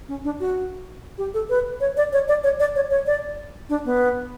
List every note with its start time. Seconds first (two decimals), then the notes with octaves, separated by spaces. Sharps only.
0.08 C#4
0.24 D4
0.40 F#4
1.18 G4
1.34 A4
1.49 B4
1.80 C#5
1.97 D5
2.12 C#5
2.28 D5
2.43 C#5
2.60 D5
2.76 C#5
2.91 C#5
3.07 D5
3.69 D4
3.85 B3